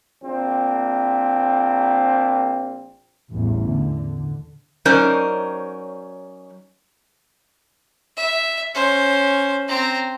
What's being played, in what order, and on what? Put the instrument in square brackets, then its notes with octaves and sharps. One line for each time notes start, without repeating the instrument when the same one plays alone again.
[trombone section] A#1 A#2 C4
[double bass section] A1 E2 G2
D3
[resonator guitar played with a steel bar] F#3 C#4 D#4 A#4 C5 D5
[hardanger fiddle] E5
C#4 C5
C4 A#5